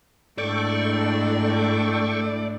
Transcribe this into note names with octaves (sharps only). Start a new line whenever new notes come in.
G#2 A3 D4 E4 A4 D5 G5 C#6